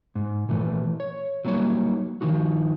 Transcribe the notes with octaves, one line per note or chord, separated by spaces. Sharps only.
G#2
A#2 E3 A3
C#5
F#3 G3 A#3 D#4 C#5
D#3 F3 D#4 F#4